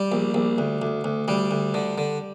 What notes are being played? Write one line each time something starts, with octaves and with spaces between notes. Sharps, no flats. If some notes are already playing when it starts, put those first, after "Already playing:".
Already playing: G3
A#1
A#1
D2
D2
D2
D2 G3
D2
D3
D3